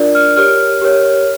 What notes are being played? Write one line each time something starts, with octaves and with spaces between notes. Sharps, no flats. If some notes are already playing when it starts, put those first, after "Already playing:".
Already playing: D4 F4 A#4 D5
F6
G4 A#4 C#5 F6
G4 A#4 C#5